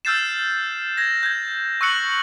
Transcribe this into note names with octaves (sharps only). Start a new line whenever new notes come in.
E6 F6 G6 A6 C7 E7
G#6 A#6
G6 G#6
C#6 E6 F#6 C#7 F#7